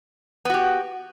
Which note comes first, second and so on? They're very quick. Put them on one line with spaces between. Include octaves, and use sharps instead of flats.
B3 F#4 G4